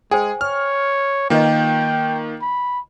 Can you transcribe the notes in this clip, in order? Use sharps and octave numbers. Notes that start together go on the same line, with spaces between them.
G#3 G#4 C5 G5 G#5
C#5 F6
D#3 A#3 F4 B4 D#5 G5
B5